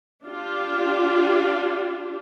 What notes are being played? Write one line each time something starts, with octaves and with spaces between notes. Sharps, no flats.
D4 F4 G4